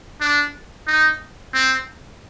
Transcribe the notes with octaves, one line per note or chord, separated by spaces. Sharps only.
D4
D#4
C4